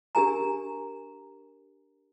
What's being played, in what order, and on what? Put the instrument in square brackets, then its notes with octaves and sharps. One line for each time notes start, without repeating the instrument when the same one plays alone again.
[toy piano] D4 G4 A#4 G#5 A#5